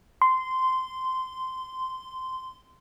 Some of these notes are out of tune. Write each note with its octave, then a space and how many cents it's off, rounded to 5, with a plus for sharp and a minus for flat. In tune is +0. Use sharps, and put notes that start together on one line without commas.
C6 -15